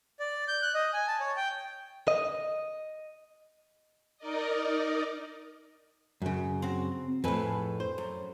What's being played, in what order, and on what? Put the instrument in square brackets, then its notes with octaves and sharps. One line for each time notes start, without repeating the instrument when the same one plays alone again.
[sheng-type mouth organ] D5
G6
F#6
D#5
G#5
A5
C#5
G5
[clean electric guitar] D#5
[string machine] D#4 A#4 D5 D#5
[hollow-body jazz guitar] F#2 C#3
[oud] C4 F#4
[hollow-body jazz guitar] F2 A2 [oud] G#4 A4 B4
[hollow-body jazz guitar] C5
[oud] F#2